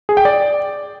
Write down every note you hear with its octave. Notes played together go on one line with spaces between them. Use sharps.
G#4
G5
D5